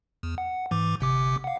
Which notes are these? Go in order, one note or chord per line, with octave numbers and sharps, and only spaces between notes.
E2
F#5
G#2 E3 D6
G1 C3 D6
F5 F#5